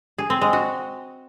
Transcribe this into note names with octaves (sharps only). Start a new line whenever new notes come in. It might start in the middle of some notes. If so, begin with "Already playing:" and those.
G#4
C4
G#3
F#4